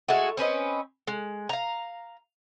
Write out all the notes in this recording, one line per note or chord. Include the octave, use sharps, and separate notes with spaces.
G#3 A3 E4 F#4
C4 C#4 B4 D#5
G#3
F5 A#5